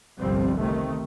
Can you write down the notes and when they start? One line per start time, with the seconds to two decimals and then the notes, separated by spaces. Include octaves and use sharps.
0.18 G1 C2 F3 G3 C4
0.57 C3 D#3 A3